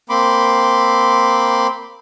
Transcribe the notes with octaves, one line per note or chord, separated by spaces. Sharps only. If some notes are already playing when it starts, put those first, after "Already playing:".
A#3 C4 B5 C6 D6